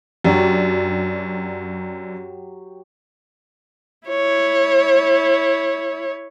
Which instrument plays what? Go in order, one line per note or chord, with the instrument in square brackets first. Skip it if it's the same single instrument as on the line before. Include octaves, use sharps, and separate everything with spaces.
[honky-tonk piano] F#2 D4 [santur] F#3 G4
[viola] E4 C#5